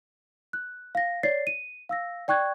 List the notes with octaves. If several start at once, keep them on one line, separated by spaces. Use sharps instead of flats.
F#6
F5 A#6
C#5 D5 A6 C7
D#7
F5 E6 A#6
D5 G5 C#6 F#6 G#6